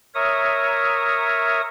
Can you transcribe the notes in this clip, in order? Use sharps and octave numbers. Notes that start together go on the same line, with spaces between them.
A#4 C#5 E5 D#6